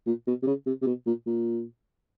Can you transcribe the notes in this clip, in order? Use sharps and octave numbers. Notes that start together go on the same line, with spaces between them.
A#2
B2
C3
C#3
C3
C3
B2
A#2
A#2